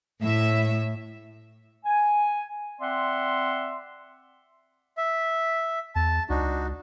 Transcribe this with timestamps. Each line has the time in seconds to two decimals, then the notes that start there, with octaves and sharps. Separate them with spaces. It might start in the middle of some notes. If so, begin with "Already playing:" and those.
0.21 A2 E5
1.85 G#5
2.81 C4 D5 E5 F#5 C6
4.97 E5
5.95 E2 A5
6.30 C#2 D4 D#4 F#4